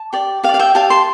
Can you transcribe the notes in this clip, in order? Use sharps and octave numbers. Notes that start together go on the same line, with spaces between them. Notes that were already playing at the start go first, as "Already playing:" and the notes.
Already playing: A5
G4 D5
G4 F5
D5
F5
E5 G5
G4 D5 F5 A5
A5 C6